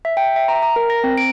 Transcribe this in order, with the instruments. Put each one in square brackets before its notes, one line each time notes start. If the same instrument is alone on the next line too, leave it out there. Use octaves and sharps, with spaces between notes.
[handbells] E5
G5
E5
A#5
A#5
A#4
A#6
C4
D7